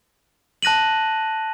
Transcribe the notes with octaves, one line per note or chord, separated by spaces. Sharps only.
A5 F#6 A#6 D#7 F#7